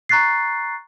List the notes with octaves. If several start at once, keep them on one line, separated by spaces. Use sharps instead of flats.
A#5 C#6 F#6 A6 C7